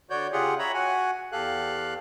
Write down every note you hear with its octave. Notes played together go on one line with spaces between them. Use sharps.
D3 F#4 C#5 D5 G6
C#3 F4 G4 G#4 F#5
C#5 E5 A#5 B5
F#4 F#5 G#5
E2 G4 A4 F5 F#6